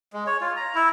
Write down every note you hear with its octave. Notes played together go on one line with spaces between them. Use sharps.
G#3
C#5
F4
A#5
E4